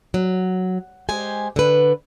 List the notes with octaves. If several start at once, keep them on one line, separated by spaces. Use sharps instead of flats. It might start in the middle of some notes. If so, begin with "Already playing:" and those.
F#3
G#3 G4 C5 G#5
D3 B4